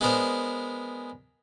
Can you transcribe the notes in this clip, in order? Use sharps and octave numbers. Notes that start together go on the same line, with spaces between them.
G#3 B3 D4 A#4 C5